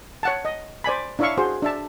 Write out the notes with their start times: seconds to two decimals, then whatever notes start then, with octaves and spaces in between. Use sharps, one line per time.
0.23 C#5 F#5 A5
0.45 D#5
0.84 C5 D5 G#5 B5
1.19 D4 E4 C#5 E5 F5 C#6
1.38 F#4 G#4 C5
1.62 D4 E5 A5